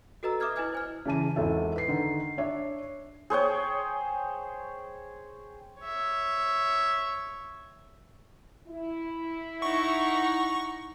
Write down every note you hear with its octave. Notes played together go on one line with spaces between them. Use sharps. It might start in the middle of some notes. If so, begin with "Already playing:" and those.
F#4 A4 B4 D#5 A#5 E6
B4 E5 D6 D#6 F6 G#6
E4 B4 D#5 G#5 F6 G#6
C5 G#5 F6
C#3 E3 A5 D#7
G#1 E2 A4 E5
B4 C7
D3 D#3
D4 C#5 E5
G#4 C5 C#5 G5
C#5 E5
E4
D#4 F#5 C#6